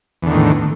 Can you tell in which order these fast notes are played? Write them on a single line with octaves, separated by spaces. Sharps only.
E2 D3 D#3 A2